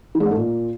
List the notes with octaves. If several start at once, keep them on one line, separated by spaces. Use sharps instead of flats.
E3
G#3
G#2
A3
A#2